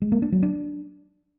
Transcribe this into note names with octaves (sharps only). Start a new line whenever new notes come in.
G#3
A#3
D4
F#3
D4